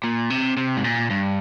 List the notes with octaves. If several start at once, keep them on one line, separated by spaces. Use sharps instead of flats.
A#2
C3
C3
G#2
A#2
G2